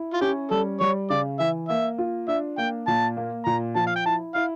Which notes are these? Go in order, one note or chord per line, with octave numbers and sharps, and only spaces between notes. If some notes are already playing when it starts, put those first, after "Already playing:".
Already playing: E4
F4
C#4 G4
G3 A4
G3 C#5
C#3 D5
E3 E5
A#3 E5
F4
D4 E5
A#3 G5
A#2 A5
A#3
A#2 A#5
F3 A5
F5
G5
E4 A5
E4 F5